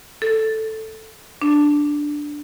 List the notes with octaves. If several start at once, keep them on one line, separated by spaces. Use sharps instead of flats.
A4
D4